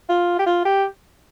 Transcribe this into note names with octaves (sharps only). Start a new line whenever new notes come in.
F4
G4
F4
G4